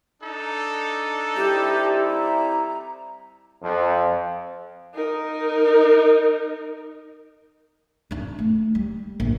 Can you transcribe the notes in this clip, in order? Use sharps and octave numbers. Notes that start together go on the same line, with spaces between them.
D4 D#4 A4
G3 C4 E4 G4
A#5
F2
D#4 A#4
D4 D#4
A3
G3
A#1